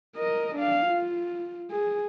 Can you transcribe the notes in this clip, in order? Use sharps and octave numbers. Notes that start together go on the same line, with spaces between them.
A#4 D#5
D4 F5
F4
G#4